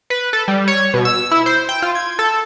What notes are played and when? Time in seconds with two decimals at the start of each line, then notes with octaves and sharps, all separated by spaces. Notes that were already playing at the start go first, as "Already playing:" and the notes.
0.10 B4
0.33 A4
0.48 G3
0.68 C#5
0.94 B2
1.05 E6
1.31 E4
1.46 C5
1.69 G5
1.82 F4
1.95 G#6
2.19 A4